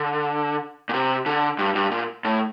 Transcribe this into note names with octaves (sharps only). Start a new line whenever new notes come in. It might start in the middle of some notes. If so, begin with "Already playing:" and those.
Already playing: D3
A#2
C3
D3
G2
G2
A#2
A2